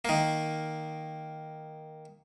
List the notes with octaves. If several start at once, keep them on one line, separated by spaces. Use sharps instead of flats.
D#3 A#3